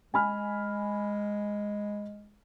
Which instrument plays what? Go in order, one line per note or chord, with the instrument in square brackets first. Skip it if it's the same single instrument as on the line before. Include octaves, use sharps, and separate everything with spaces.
[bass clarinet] G#3 [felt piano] G#5 B5 F6